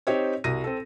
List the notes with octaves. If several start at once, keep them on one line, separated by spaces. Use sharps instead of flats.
C4 D#4 G4 C5 C#5
C2 F#4 A#6 D#7
C4 A4